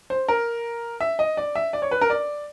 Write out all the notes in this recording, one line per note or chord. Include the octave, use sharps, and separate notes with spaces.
C5
A#4
E5
D#5
D5
E5
D5
C#5
B4
A#4
D5